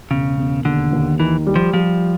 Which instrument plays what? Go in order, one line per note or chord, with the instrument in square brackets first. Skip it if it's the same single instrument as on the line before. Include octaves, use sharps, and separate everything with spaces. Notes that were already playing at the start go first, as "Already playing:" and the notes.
[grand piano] E1 [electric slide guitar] C#3
[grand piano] E1
[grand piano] D#2 [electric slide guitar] D3
[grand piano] D#2
[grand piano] D#3 [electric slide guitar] E3
[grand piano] G3
[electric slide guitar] F3
[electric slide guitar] F3 [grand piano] G3